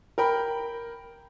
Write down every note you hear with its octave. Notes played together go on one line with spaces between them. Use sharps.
A#4 G5 B5